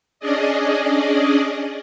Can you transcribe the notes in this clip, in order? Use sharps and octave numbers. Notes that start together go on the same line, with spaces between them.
C#4 D4 G#4 D5 D#5